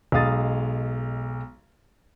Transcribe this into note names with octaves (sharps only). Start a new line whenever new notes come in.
B1 G#3 F5 D#6 A6